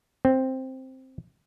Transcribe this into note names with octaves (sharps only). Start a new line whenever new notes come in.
C4